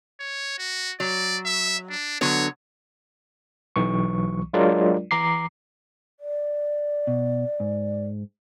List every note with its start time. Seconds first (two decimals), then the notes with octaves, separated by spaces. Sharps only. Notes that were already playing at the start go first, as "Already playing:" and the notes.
0.20 C#5
0.58 F#4
1.00 F#3 D5
1.45 E5
1.90 D4
2.21 D3 F#3 B3 C#5
3.76 B1 E3 C#6
4.53 F#3 G#3 D4 F4 A#4 D5
5.11 E3 A#5 D6 C7
6.20 D5
7.07 B2
7.60 G#2